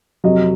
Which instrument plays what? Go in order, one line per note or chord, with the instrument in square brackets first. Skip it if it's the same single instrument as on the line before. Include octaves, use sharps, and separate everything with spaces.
[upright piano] F2 C3 F#3 D#5